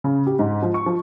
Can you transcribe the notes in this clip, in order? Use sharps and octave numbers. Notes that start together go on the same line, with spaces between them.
C#3
G4
G#2
F3
C#6
F3